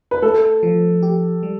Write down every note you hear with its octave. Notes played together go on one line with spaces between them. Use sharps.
B4
A3 A4
F3
G4
G3